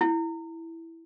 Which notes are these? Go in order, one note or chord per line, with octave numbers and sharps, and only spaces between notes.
E4